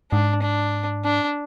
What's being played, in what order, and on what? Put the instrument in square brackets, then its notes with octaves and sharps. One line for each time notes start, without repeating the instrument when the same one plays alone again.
[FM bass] G#2 [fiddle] D4
[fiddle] D4
D4